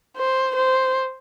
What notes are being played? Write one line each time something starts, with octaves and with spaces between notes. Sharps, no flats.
C5
C5